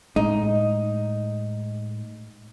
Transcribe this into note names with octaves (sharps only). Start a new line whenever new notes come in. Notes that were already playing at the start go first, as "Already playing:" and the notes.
A2 G#3 D#4